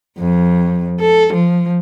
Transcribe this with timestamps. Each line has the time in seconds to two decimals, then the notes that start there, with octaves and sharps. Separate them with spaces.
0.18 F2
1.01 A4
1.34 F3